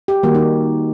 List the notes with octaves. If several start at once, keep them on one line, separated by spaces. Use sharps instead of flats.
G4
D#3 G3 A#3 F#4
D#4